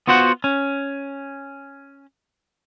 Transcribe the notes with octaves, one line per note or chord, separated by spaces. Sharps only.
B3 F4 F#4 C5 F#5
C#4